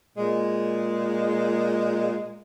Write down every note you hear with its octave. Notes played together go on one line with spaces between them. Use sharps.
A#2 G#3